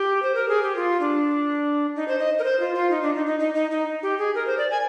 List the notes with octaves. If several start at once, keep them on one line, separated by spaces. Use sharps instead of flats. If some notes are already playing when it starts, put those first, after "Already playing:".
Already playing: G4
C5
A#4
G#4
G4
F4
D4
D#4
C5
D#5
A#4
C5
F4
F4
D#4
D4
D#4
D#4
D#4
D#4
D#4
G4
G#4
A#4
C5
D5
G#5